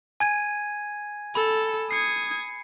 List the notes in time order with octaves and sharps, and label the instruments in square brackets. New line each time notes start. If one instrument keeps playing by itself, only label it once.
[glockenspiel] G#5 G#6 D#7
[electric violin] A4 [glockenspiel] B5
[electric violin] D#6 G#6 [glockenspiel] C7 C#7